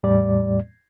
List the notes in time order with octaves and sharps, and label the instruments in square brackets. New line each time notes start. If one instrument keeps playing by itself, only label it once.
[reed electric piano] E2 A2 G3 D5